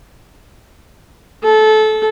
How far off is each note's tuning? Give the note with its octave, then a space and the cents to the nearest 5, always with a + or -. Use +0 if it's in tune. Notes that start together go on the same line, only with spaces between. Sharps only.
A4 -25